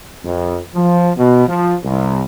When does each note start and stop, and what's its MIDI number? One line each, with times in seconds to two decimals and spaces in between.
0.24 0.57 41
0.74 1.10 53
1.17 1.44 47
1.47 1.74 53
1.83 2.22 36